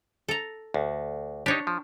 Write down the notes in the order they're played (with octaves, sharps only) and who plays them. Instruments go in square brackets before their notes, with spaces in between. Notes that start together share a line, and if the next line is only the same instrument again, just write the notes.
[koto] A4 A#5
[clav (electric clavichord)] D2
[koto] D4 C#5 [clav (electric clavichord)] D#4 G4
[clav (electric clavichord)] F3